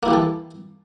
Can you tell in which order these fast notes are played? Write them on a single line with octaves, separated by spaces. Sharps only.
A#3 E4 G4 E3 A4